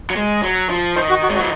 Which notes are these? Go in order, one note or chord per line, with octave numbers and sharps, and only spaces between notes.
F#3
G#3
F#3
F3
D#3 C5
F#4
F#4
G#3
F#4
F#3